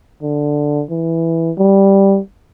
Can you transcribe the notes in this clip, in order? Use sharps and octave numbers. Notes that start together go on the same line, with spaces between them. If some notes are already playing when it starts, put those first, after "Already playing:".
D3
E3
G3